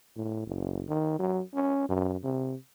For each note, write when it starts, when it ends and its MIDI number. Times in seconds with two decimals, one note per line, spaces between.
0.16 0.46 45
0.47 0.83 30
0.88 1.18 51
1.19 1.42 54
1.54 1.86 61
1.89 2.15 42
2.24 2.55 48